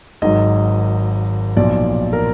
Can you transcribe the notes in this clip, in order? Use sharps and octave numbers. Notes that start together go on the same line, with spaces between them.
G#1 G#2 D#3 F#3 D#5
B1 A#2 F3 D5
A#4